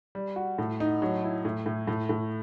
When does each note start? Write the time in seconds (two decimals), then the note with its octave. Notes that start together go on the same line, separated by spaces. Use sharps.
0.15 G3
0.36 F#4
0.58 A2
0.80 D#4
1.02 F#3
1.23 E4
1.45 A2
1.66 A2
1.87 A2
2.09 A2